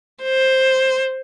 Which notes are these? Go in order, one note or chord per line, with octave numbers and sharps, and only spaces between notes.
C5